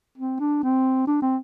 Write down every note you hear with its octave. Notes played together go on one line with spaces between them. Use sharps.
C4
D4
C4
D4
C4